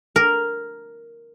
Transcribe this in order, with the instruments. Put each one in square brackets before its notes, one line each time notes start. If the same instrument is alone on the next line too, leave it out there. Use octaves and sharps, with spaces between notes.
[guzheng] A#4